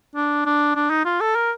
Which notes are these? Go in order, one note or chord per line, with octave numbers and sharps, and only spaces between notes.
D4
D4
D4
D#4
F4
A4
A#4